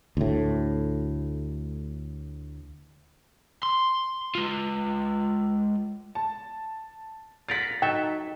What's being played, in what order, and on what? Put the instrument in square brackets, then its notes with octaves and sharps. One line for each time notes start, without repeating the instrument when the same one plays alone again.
[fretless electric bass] D2 A2
[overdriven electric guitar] C6
G#3 F4
[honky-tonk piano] A5
[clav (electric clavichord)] F4 A#4 F#5 [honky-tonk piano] A6 B6
[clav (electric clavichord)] F#3 A4 E5 [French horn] D#4 [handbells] G5